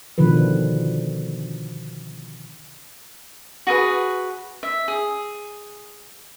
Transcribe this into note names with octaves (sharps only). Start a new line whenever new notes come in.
B2 D3 D#3 F3 B4
F#4 G#4 B4
E5
G#4